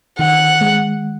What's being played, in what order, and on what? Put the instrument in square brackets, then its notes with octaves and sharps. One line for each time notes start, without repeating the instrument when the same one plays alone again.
[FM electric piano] D#3 [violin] F#5
[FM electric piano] G#3